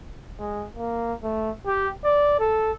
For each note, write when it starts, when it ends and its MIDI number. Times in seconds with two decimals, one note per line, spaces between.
0.39 0.65 56
0.77 1.13 58
1.23 1.51 57
1.66 1.89 67
2.04 2.39 74
2.40 2.72 69